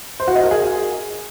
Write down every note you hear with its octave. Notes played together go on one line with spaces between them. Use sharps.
C5
F#4
D#5
A#4
G#4